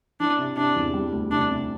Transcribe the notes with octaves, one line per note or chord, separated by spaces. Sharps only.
E3 D4
C3
C3 D4
E2
G3
D2
C3 D4
C3